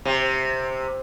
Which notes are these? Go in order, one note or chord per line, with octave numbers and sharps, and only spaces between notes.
C3